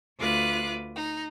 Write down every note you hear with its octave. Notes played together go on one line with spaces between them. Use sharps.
D2 F4 B4 D6 F#6
D#4